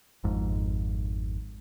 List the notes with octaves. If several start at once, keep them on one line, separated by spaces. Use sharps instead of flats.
G#1 F2 G#2